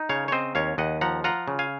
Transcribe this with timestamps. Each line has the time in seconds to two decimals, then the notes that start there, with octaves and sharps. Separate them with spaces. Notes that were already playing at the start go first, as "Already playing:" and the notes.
Already playing: D#4
0.09 C#3 C#5 F5
0.28 C#5
0.32 C4 C5 D#5
0.55 D#2 C#5 F5
0.78 D#2 D#5 F#5
1.01 F3 F#5 A#5
1.24 F4 F#5 A#5
1.48 C#3
1.59 F5 G#5